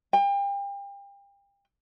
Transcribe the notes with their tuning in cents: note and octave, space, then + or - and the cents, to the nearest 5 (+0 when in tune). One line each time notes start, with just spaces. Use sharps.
G5 +35